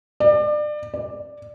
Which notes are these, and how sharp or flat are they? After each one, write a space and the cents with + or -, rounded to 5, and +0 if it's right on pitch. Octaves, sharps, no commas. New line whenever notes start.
D5 +30
D5 +10